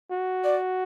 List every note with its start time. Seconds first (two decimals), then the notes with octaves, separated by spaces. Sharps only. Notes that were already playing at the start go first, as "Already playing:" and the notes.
0.11 F#4
0.44 D5